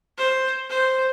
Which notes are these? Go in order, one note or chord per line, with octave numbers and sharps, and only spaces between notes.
C5
C5